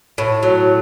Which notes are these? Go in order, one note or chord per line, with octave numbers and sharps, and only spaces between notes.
A2
F#3